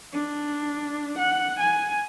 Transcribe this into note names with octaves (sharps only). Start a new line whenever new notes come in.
D4
F#5
G#5